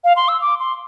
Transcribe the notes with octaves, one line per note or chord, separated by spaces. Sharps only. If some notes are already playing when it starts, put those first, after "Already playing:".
F5
C6
E6
D6
C6